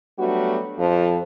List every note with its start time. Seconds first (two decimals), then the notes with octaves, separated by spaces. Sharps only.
0.19 F#3 G3 A3 B3 D4 F#4
0.78 F2 F3